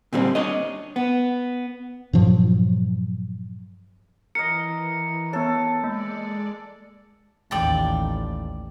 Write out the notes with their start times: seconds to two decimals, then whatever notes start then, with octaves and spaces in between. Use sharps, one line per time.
0.13 A#2 D3 G3 C4
0.35 D4 C#5 D#5
0.96 B3
2.13 G2 A#2 F3 F#3
4.35 E3 A#4 D#5 C#7
5.33 B3 A4 C#5
5.84 G#3 A#3 D5
7.51 A1 D#2 D5 G5 A5